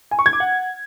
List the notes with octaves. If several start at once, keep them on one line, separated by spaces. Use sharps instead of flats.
G#5
C#6
G#6
D6
F#5